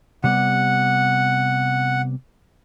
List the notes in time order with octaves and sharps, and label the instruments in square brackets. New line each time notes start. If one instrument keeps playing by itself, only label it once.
[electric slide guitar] C3 G3 B3 [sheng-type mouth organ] F#5